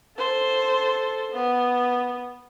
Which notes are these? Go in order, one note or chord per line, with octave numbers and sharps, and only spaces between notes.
A4 C5
B3